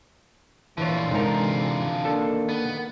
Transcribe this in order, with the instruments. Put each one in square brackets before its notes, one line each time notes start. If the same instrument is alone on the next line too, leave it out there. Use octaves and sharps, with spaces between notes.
[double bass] A#1 [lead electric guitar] D3 F4 [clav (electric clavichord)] E3 B4 C#5
[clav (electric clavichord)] G#2 D#4 A#4 [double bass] C3 E3
[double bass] D#3 A#3 [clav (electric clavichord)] D4 A4
[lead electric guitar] B3